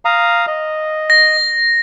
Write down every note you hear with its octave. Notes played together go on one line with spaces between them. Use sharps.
F5 A#5 D#6
D#5
A#6